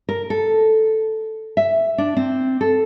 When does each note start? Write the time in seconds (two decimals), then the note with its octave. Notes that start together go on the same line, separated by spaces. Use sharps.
0.09 A#4
0.30 A4
1.57 E5
1.98 D4
2.17 C4
2.61 A4